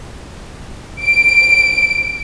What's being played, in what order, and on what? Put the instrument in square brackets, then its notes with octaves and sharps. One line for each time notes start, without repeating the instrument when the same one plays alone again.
[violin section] D7